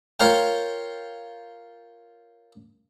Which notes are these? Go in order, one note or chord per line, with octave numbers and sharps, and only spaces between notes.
F4 A#4 C#5 F5 G5